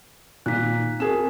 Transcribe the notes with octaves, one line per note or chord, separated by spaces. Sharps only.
A#2 D#3 F#6 B6
C4 F#4 G#4 A#4 E7